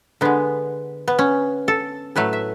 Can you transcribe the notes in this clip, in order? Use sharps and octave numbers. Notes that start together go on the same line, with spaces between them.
D3 G#3 B3
B3
C#4
A4
A2 F#3 A3 B4
E5